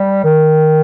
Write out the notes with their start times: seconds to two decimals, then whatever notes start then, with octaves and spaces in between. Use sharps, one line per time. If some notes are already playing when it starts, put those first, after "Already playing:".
Already playing: G3
0.24 D#3